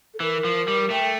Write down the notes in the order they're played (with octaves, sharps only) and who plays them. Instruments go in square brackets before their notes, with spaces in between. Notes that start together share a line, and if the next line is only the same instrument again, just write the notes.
[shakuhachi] A4
[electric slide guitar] E3 [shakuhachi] A#4
[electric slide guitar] F3
G3
[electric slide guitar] A3 [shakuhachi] G5